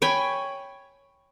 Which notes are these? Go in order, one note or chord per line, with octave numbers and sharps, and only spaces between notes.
C#5 G5 G#5 B5